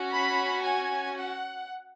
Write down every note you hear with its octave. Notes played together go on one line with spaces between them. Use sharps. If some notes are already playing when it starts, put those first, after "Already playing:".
Already playing: C#4 F#4
B5
G#5
F#5